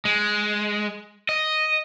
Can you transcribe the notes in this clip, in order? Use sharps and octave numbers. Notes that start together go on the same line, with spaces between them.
G#3
D#5